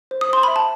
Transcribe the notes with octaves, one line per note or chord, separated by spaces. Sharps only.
C5
D#6
C5 C6
E5 B5
A5